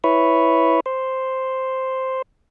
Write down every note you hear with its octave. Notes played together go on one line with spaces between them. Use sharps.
E4 B4 C#5
C5